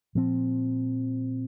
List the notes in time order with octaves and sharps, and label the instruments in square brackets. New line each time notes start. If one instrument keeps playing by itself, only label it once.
[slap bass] A#2 F3 C4